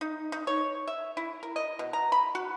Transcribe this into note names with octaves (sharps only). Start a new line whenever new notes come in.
D#4
D#4
C#5
E5
E4
A#4
D#5
B2
A#5
B5
F#4